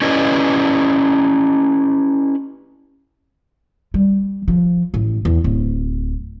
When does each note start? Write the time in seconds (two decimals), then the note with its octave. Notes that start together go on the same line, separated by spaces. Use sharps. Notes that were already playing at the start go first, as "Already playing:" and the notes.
0.02 C#4 E4 G4 B4 D5 D#5
3.94 G3
4.48 F3
4.94 A1
5.25 E2
5.44 D1